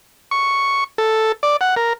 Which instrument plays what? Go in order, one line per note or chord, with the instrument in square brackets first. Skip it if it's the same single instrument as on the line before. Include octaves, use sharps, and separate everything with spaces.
[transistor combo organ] C#6
A4
D5
F#5
A#4